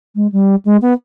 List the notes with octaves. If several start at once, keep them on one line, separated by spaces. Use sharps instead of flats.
G#3
G3
G#3
B3